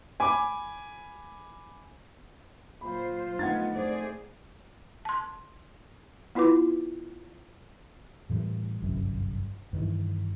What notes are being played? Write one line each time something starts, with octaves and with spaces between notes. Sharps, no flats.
G#5 B5 D6
A#2 F#3 F4 C5 B5
D3 F3 A3 B3 D#4 F#5 G#6 A6
A3 G#4 C5 D5
A5 C6
B3 E4 F4 B4 D6
A2 E3 F3 G3
G1 C2 F#2
G2 D#3 E3